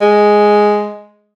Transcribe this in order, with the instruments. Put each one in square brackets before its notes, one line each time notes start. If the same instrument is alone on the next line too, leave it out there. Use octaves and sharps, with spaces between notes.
[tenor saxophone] G#3